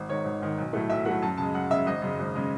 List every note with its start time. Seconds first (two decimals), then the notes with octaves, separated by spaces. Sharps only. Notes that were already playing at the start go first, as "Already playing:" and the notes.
Already playing: G#1
0.09 G#2 D#3 C#5
0.25 G#1
0.42 G#2 D#3
0.58 B1
0.73 A2 F#3 A3
0.90 B1 E5
1.05 A2 F#3 A3 F#5
1.22 F#2 A5
1.37 C#3 G#3 A5
1.54 F#2 F#5
1.71 C#3 G#3 E5
1.87 G#1 D#5
2.02 F#2 C#3 G#3
2.19 G#1
2.35 C#3 G#3